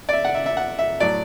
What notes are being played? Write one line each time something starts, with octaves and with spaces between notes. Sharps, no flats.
D5
E5
F#5
E5
E5
F#5
E5
A2 F#3 D5